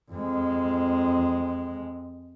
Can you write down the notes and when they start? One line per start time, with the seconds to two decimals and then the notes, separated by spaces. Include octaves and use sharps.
0.12 F2 G#3